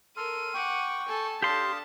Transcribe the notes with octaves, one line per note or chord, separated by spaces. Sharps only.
A4 A#4 C6 F6 D#7
F#5 G5 C#6 D6
A4 G#5 A5
D4 G4 A4 F5 A5 C6 D#6